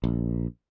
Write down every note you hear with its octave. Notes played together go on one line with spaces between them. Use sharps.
A#1